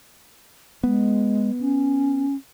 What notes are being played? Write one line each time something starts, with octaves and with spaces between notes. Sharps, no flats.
G#3 B3
C#4